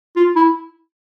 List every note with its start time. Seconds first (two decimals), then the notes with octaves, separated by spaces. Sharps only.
0.16 F4
0.36 E4